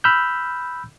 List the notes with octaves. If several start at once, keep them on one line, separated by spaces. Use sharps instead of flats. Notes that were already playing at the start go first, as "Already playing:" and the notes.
B5 E6 F6 G6